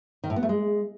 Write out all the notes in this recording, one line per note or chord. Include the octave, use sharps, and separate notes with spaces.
D#3
A2
B3
A3
G#3